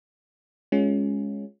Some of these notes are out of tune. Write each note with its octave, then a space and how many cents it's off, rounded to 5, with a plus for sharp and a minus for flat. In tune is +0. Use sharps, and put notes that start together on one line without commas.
G#3 +0 C#4 +0 F4 +15